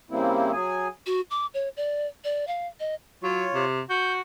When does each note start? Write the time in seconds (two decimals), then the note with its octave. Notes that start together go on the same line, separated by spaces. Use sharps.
0.11 C#3 G3 A#3 C4 E4
0.53 F#3 G#4 G#5
1.06 F#4
1.31 D6
1.54 C#5
1.77 D5
2.24 D5
2.47 F5
2.80 D#5
3.23 F#3 F4 C#5
3.54 C3
3.90 F#4 G6